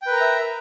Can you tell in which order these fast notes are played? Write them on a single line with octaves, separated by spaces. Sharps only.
G5 B4 A#4 A#5 E5